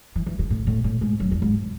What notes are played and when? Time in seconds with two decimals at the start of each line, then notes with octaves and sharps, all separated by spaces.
0.16 E3
0.26 E3
0.39 C#3
0.50 A2
0.67 A2
0.84 A2
1.01 G#2
1.20 F#2
1.31 E2
1.42 G#2